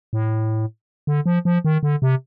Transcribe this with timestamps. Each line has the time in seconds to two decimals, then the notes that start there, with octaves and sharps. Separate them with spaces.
0.13 A2
1.07 D3
1.26 F3
1.45 F3
1.65 D#3
1.83 D3
2.02 C3